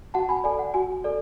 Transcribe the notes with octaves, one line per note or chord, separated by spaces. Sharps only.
F#4 F#5 A5
G#5 B5
A4 D5 G#5
F#5
F#4 G#5
A4 D5